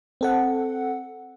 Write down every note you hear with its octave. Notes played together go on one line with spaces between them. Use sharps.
C4 A4 F#5